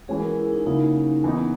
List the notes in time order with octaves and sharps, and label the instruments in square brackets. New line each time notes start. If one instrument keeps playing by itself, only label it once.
[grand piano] E3 G#3 C#4 F#4 [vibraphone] G#4
[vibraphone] A#4
G#4
E4
D#4
[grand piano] C#3 F#3 A#3 E4 A#4 [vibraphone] D#4
[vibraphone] C#4
C#4
[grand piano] E3 B3 D#4